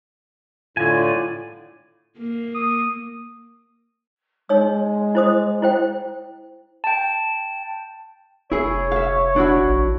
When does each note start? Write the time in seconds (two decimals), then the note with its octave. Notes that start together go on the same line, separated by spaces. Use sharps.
0.77 A2 D3 F4 D5 G#5
2.18 A#3
2.55 D#6
4.49 G#3 D#4 C#5 E6
5.15 E4 C5 D#6
5.62 E4 C5 G5
6.84 G5 A5
8.52 F1 E4 G#4 C#5
8.92 E5 F5
9.36 D4 E4 F#4
9.66 A#1